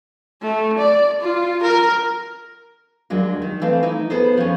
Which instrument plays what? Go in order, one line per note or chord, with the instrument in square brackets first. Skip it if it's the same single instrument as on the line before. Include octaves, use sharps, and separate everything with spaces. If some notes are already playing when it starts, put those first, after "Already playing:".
[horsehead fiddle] A3
D5
F4
A#4
[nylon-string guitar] D#2 F#3 G#3 D4
D#3
E3 A3 C4 F5
D#4 E4
B3 G#4 A4 C5
F3 C#4